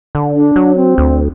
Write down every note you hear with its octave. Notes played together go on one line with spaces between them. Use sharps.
D3
D4
F#3
C4
D2